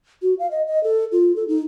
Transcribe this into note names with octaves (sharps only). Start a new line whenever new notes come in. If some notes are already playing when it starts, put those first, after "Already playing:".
F#4
F5
D#5
D#5
A4
F4
A4
D#4